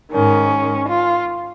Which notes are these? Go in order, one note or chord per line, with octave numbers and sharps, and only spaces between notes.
G#2 D#3 C#4
F4